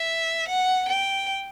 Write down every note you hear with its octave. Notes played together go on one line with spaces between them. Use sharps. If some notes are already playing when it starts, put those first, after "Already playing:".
Already playing: E5
F#5
G5